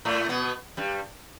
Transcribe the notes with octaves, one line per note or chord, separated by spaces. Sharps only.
A2 A3
B2 B3
G2 G3